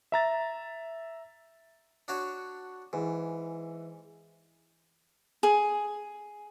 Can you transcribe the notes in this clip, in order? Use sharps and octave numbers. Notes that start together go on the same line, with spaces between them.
E5 A#5 A6
D4 F#4 C#5
G#2 E3
G#4